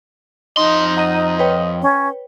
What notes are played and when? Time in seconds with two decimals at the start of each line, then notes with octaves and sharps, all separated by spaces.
0.57 F2 D#4 D#5 C6
0.97 F#5 A#5 D#7
1.39 B4 C#5 G5
1.82 C#4